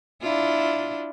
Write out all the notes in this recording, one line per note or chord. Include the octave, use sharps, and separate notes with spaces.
D4 E4 F4